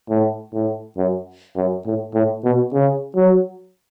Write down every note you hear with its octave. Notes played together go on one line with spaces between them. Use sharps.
A2
A2
F#2
F#2
A2
A2
B2
C#3
F#3